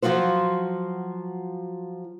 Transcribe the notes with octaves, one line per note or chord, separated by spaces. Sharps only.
F3 F#3 F4 F#4 C5